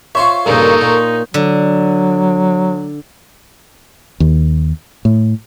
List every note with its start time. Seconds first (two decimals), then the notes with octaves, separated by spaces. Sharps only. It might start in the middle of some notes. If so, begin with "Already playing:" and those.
0.15 F4 C5 C#5 E5 C6 C#6
0.46 G2 A#2 C#3 D#4 A4 A#4
0.81 A#2
1.34 D3 F#3
4.20 D#2
5.05 A2